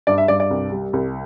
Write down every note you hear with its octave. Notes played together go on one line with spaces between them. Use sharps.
G2 D5
E5
G2 D5
D5
C2
G3
C2